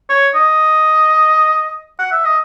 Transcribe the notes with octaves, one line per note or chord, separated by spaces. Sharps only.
C#5
D#5
F#5
E5
D#5